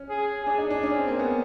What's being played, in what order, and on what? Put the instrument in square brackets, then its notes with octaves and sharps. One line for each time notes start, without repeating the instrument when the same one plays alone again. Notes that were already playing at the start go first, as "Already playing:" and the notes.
Already playing: [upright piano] C#4
[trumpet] G#4
[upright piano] D4 [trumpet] G#4
[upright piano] D#4
D4
C#4
C4
A#3
B3